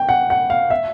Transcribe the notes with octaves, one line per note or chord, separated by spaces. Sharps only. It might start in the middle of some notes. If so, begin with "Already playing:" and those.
Already playing: G5
F#5
F#5
F5
E5